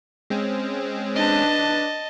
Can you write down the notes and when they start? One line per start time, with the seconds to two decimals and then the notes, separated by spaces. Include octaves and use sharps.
0.30 G#3 C4 C#4
1.16 D4 B4 D#5 A5